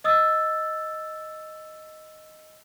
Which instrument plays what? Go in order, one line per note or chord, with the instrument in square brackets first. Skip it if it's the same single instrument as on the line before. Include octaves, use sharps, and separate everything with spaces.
[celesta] D#5 D#6 E6 A6